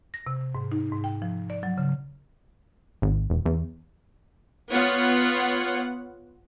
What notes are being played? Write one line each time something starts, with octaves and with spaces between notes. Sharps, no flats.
A#6
C3
G#2
D#4
G#2
G5
F3
D5
F#3
C#3
G#1
E1
E2
B3 F4 C#5 F#5